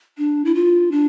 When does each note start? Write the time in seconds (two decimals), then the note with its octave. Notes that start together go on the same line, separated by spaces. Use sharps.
0.18 D4
0.45 E4
0.55 F4
0.91 D4